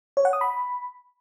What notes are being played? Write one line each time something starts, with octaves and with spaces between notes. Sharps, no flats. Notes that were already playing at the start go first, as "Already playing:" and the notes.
C#5
F#5
D#6
B5